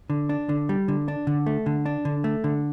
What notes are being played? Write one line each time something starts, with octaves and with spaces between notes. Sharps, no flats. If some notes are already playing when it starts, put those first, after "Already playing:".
D3
D4
D3
G3
D3
D4
D3
A3
D3
D4
D3
A3
D3